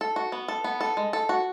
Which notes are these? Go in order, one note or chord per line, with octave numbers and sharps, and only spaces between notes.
A4
F#4
B3
A4
B3
A4
G#3
A4
F#4